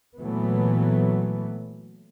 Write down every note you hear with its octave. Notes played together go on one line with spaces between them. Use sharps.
A#2 E3 F#3 A3 B3